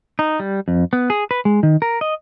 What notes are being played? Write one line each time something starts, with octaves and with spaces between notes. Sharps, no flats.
D#4
G3
F2
B3
G#4
B4
G#3
D#3
A#4
D#5